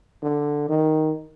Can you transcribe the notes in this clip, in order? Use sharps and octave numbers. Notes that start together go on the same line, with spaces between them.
D3
D#3